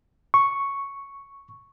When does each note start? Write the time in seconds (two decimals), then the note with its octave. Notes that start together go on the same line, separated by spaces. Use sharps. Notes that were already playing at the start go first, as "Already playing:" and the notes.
0.34 C#6